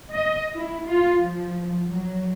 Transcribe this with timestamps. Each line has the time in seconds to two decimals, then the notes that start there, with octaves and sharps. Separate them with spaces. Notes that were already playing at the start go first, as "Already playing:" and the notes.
0.12 D#5
0.57 E4
0.87 F4
1.21 F3
1.88 F#3